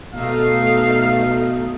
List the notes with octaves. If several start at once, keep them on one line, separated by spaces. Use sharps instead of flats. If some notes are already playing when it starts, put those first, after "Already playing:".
B2 A3 D#4 F5